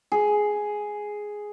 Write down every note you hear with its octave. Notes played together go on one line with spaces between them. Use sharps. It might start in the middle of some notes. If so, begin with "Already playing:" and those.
G#4